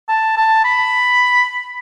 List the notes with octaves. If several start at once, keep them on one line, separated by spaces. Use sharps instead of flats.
A5
A5
B5